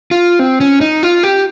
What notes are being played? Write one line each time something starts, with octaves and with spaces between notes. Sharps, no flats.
F4
C4
C#4
D#4
F4
G4